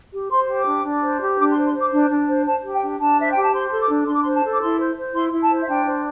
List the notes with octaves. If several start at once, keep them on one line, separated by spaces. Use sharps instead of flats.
G4
C5 C6
G4
D6
D4
D4
C5
G4
D4 D6
C6
C5
C6
C5
D6
D4
D4
C5
C5 A5
G4
G5
D4
D4 A5
C5 E5
G4 G5
A5
C5 C6
A4 C6
D6
D4
D4 C6
D6
C6
C5
A5
A4
D6
E4 C6
C5
C5
E4 C6
E4
A5
C5
E5
D4 G5
C5